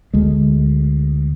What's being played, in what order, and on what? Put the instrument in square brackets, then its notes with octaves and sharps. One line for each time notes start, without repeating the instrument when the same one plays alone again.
[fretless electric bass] D2 G#3